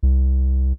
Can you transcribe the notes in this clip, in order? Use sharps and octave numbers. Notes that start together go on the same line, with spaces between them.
C2